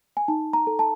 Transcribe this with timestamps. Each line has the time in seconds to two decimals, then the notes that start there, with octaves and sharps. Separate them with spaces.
0.17 G#5
0.28 D#4 A5
0.53 A#5
0.67 A4
0.79 A5